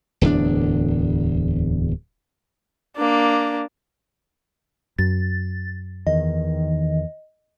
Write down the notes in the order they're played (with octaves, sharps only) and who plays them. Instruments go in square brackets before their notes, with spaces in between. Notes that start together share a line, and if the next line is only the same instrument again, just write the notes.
[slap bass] D1 E2 E3 D4
[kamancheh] A#3 D4
[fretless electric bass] F#2 [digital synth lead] A6
[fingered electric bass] E2 [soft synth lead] D#3 [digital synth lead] D#5